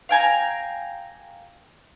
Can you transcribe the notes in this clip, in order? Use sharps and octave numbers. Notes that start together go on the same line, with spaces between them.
F5 G5 G#5 A#5